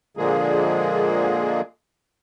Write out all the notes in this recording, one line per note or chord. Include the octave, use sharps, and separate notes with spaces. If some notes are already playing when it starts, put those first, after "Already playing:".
A#2 D3 F3 G#3 A#3 G#4